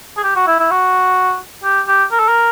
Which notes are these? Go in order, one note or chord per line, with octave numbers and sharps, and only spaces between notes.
G#4
G4
F#4
E4
E4
F#4
G4
G4
A#4
A4
A#4